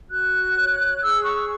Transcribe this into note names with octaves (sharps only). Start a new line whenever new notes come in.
F#4 F#6
C#5
G#4 E6
C#6